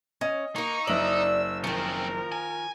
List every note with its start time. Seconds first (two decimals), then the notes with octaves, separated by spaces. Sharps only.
0.21 C#4 D#5
0.56 A#3 D#4 A#4 C#6
0.87 F#1 D5 E5 E6 F#7
1.64 D#3 F3 C4 C#4 A#4
2.32 G#5